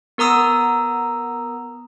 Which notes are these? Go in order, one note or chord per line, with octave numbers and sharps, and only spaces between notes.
B3 A#4 A#5 D#6 E6